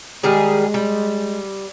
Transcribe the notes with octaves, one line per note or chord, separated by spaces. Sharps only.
D#3 G3 G#3 G#4
G3